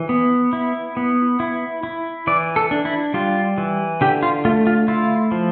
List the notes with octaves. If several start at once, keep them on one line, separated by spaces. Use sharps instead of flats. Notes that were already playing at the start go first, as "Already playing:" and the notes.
Already playing: E3
B3
E4
B3
E4
E4
E3 D5
A4
D4
E4
G3 F4
E3
D3 G4
F4
A3 F4
F4
E4 F4
F3